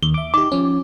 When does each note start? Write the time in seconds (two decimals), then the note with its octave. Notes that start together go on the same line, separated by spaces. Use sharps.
0.03 D#2 G7
0.14 E5 D6
0.34 D#4 G4 D6
0.52 F3 C#4